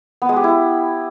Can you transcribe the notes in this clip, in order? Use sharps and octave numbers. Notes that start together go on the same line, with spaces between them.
B3
G#3
G4
E4